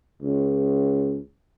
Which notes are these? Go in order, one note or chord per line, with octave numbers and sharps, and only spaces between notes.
C#2